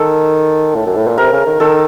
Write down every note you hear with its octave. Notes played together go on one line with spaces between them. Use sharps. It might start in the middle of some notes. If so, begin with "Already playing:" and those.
Already playing: D#3 A4
A2
F#2
A2
A#2
C3 A#4
C#3
D#3
D#3 A4